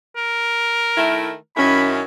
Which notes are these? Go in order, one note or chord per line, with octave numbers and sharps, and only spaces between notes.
A#4
D#3 A3 E4
F#2 D#3 C#4 E4 B5